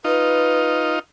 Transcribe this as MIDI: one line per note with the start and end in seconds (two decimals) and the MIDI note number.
0.04 0.99 63
0.04 0.99 65
0.04 0.93 71